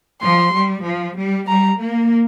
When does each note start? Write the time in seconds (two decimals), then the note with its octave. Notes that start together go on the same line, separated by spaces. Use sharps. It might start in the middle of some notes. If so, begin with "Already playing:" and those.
0.22 F3 C6
0.53 G3
0.84 F3
1.17 G3
1.48 G3 A#5
1.79 A#3